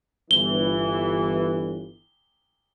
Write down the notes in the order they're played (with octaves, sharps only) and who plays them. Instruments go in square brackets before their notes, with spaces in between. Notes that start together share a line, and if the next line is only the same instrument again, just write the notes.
[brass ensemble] G1 E3 [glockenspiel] G7